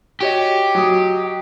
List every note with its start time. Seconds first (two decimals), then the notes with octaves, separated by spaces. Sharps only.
0.21 F#4 G4 C#5 D#5
0.75 F#3 D#6